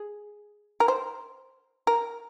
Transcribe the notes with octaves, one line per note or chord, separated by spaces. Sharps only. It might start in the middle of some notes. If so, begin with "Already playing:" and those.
Already playing: G#4
A#4
C5
A#4